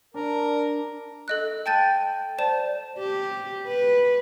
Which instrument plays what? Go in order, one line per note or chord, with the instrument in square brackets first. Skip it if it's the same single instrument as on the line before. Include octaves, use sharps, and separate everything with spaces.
[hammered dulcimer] D4 [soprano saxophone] A#4
[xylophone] A4 D#5 F#6
G5 A5 G6 A6 D#7
C5 D5 A5 E7
[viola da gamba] G4
B4